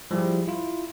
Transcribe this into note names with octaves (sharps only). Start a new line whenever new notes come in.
F3 G3 E4 G4 G#4
E4 F4